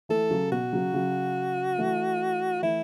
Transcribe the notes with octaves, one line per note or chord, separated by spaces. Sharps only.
E3 A3 A4
C#3 F#3
B2 F#4
C#3 F#3
C#3 F#3
E3 A3
E3 A3 E4